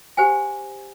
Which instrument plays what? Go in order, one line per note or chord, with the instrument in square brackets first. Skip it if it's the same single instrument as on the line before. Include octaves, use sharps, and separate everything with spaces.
[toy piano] G4 C5 F#5 G#5